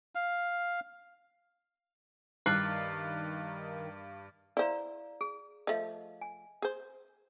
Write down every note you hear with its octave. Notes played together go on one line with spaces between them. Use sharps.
F5
G2 D#3 D6 F6 F#6 A6 C7
E4 C5 D5 F5 A#5
G#4
F3 A3 D#5 F5
G#5
G#4 C5